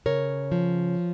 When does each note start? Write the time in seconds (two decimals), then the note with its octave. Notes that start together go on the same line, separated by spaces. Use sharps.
0.06 C#3 A#4 C#5
0.52 F3